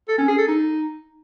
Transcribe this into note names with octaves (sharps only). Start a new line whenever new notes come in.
A4
C#4
G#4
A4
D#4